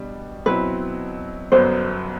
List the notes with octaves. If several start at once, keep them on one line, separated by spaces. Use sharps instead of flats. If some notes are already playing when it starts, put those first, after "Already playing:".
Already playing: B2 G3 D4
B2 F#3 C4 E4 B4
G1 F#2 F#3 B3 C5